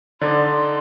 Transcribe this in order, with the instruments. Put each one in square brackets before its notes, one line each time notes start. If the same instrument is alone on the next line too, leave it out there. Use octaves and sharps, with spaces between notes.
[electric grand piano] D3 D#4 [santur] D5 [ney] C6